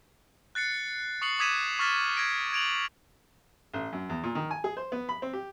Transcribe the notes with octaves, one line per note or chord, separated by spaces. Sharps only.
F#6 A6 C7 C#7
C#6 D#6 C7 C#7 F#7
D6 D#6 G#6 B6 D#7 E7
C#6 F6 A6 B6 E7
G#6 A#6 D7
G#6 D7 F7 F#7
A1
F#2
E2
A#2
D#3
G#5
G#4
C5
B3
B5
C4
G4